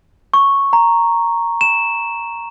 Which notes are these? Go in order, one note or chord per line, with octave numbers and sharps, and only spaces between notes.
C#6
A#5
E7